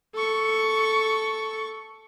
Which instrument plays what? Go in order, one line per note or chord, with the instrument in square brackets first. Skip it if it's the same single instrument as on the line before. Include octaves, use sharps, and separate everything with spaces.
[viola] A4 C#6